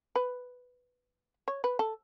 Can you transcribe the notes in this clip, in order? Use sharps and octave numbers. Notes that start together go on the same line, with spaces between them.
B4
C#5
B4
A4